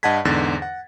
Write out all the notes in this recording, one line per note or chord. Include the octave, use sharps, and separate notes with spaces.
G2 D#5 F#5 A5 G#6 B6
E2 G#2 D3 A6 A#6
F#5